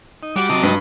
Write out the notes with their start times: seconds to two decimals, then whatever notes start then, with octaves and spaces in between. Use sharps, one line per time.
0.23 D#4
0.36 G3 F#4 D6
0.50 C3 F#3 D#5 A5 A#5
0.63 G2